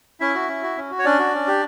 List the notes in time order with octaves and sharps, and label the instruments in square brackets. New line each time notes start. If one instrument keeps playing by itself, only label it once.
[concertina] C#4 E4 E5
F#4
C#4
F#4
C#4
F#4
C#5
C#4 D4 D5
F#4
C#4
G4